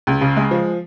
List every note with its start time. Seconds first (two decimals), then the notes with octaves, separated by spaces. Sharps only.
0.07 C#2
0.21 C#3
0.37 G#3
0.51 F3